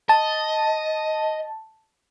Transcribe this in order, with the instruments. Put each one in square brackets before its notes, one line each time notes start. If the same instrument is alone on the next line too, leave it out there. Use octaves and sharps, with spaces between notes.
[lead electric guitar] D#5 [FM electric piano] A5